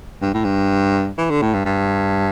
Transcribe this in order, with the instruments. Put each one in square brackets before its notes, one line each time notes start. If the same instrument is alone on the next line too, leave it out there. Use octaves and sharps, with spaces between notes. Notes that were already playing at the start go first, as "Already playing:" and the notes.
[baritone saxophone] G2
A2
G2
E3
D3
A2
G2
G2